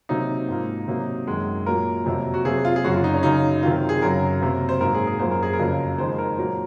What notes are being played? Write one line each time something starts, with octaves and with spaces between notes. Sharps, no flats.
C3 F#3 A#3 D#4
G#2 F3 A#3
C3 F#3 A#3
F#2 D#3 G#3
A#2 F#3 A#3 A#4
F2 C3 F#3 A#3
F#4
C3 F#3 A#3 G#4
F4
G#4
F#2 C#3 F#3 F#4
F4
D#4
C#4
F#2 C#3 F#3 D#4
C3 D#3 F#3 F4
G#4
F#2 C#3 F#3 A#4
C3 F#3 A#3
C5
G#2 F#3 A#3 A#4
G#4
G#4
F#2 F3 A#3 C5
A#4
G#4
A#4
F2 C#3 F#3 A#3
F2 D#3 G#3 C5
A#4
A#2 F#3 A#3